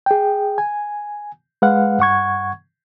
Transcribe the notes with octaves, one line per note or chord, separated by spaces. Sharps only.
G#4 G5
G#5
G#3 B4 F5 F#5
G2 F#5 C#6 G#6